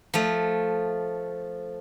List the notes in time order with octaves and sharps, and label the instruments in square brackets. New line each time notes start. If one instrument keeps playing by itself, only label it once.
[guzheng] F3 A3